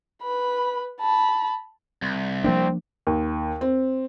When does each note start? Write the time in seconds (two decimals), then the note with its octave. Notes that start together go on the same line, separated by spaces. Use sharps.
0.23 B4 B5
1.01 A5 B5
2.02 C2
2.44 F3 A#3 C4 D4
3.07 D#2
3.61 C4